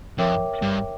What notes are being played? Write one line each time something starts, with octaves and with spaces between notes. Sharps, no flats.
F2 A#4 C#5 E5 G5 D6
G2